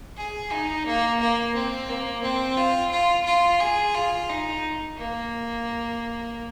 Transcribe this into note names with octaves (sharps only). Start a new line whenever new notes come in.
G#4
D#4
A#3
A#3
C4
A#3
C4
F4
F4
F4
G#4
F4
D#4
A#3